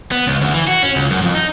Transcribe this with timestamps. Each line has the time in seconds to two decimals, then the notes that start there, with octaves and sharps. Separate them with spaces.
0.12 B3
0.27 C#2
0.41 D2
0.54 E3
0.67 F#4
0.83 C#4
0.96 C#2
1.10 F#2
1.22 F2
1.35 D#4